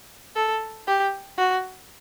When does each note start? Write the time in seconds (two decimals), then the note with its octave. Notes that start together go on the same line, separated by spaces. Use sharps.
0.36 A4
0.87 G4
1.38 F#4